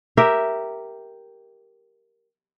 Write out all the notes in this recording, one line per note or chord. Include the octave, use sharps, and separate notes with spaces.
G4 A#4 E5